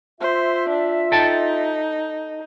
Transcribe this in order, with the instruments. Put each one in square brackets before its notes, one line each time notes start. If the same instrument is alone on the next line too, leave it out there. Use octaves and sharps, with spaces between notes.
[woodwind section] F4 E5 [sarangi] C5
[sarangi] D4
[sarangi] D#4 [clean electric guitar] A4 G5 A5